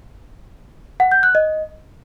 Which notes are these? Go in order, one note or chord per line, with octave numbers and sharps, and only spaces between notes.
F#5
G6
F#6
D#5